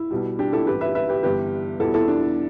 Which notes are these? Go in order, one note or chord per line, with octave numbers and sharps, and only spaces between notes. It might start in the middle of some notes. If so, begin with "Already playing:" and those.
Already playing: E4
B1 B2 G3
D4 G4
E4 A4
A1 G2 E3 G4 B4
B4 E5
B4 E5
G4 B4
G1 G2 E3 G3 G4 B4
E2 B2 G3 E4 A4
E4 A4
D4